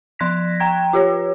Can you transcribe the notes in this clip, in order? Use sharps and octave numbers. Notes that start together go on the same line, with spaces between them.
F3 C6 F#6 G#6 A#6 B6
G5 A#5 G#6
F4 G4 C#5